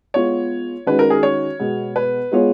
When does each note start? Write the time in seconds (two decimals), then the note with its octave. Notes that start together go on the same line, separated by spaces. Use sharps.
0.14 G#3 B3 F4 C#5
0.86 D#3 G#3 C#4 F#4 B4
0.99 A#4
1.10 G#4
1.23 C#5
1.59 B2 G#3 B3
1.96 B4
2.32 G#3 B3 F4 G#4 C#5